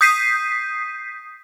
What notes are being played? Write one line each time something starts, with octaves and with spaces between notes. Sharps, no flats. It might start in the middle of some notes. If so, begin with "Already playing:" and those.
D#6 G6 B6 C7 D#7